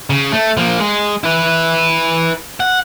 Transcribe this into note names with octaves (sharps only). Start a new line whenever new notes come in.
C#3
A3
F3 A#3
G#3
E4 B4
F#5